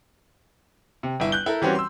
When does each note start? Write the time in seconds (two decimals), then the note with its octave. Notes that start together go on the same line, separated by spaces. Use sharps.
1.03 C3
1.20 G1 E4
1.32 F#6 G6 G7
1.46 E4 A4 A#4
1.62 E3 G3 C4 C#4 F#4
1.75 C6 E6